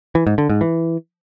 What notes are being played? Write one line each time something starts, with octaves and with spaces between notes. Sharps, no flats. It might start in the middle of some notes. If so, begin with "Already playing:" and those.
E3
G#2
D3
G#2
E3